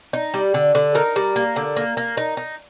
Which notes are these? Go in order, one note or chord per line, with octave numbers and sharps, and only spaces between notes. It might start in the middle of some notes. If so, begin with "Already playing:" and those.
D#4
G3
D3
D3
D#4 A#4
G3
A#3
D3
A#3
A#3
D#4
D#4